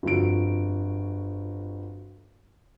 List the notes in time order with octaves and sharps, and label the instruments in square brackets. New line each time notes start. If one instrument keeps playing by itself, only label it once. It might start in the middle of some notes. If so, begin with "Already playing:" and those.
[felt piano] G1 F2 F#4 D7